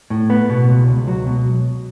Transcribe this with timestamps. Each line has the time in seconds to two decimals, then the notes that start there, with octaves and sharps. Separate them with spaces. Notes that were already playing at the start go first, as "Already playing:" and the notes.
0.10 A2
0.30 B3
0.50 B2
0.69 C#2
0.88 C#2
1.08 F#3
1.26 B2